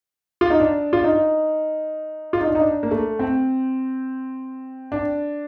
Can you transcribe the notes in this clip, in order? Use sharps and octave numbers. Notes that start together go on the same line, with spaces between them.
F4
D#4
D4
F4
D#4
F4
D#4
D4
D#4
D4
A#3
A3
C4
D4